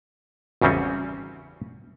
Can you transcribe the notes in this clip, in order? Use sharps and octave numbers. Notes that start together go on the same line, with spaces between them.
G#1 E2 C#3 G3 C4 C#4